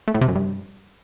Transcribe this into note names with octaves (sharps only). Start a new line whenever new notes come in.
A3
A2
C3
F#2
G2